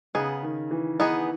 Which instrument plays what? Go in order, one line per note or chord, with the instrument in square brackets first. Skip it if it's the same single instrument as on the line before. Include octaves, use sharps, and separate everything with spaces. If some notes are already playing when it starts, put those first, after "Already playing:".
[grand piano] C#3 [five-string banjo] B3 D#4 G#4
[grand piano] D#3
E3
[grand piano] E3 [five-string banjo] B3 D#4 G#4